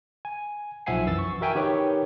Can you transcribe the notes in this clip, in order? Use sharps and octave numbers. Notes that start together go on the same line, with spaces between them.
G#5
B1 F3 E5 F#5 G#5 C7
F#2 E3 E6 A6
C#6
F#4 A#4 E5 G5 G#5
D#3 G4 B4 C#5